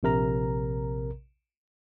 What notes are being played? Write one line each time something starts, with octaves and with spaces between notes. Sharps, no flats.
A#1 C3 A#4 A#5